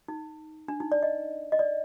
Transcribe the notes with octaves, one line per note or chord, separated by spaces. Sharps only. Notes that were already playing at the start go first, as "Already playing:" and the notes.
D#4
D4
D#4
D5
D#5
D#5
D5